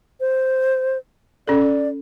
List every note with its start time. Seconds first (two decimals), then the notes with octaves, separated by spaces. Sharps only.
0.20 C5
1.47 C#4 A4 D5